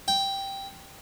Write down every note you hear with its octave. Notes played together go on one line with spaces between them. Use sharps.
G5